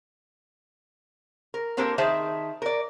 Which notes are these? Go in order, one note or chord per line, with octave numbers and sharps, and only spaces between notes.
A#4
A#3 C4 D4 G4 A4 A#4
D#3 G#4 C5 E5 A5
A#4 D5